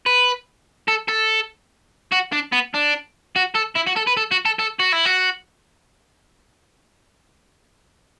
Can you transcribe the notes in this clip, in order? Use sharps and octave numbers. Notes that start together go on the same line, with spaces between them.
B4
A4
A4
F#4
D4
B3
D4
F#4
A4
E4
F#4
A4
B4
A4
F#4
A4
A4
F#4
E4
F#4